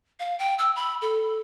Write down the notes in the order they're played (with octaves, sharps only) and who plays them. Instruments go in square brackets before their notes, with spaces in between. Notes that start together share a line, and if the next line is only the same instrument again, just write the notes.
[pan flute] F5
G5
E6
B5
A4